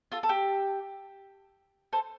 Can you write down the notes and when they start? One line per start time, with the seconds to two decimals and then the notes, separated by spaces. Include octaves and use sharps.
0.12 F4 A4
0.23 A4
0.29 G4
1.93 A4 C5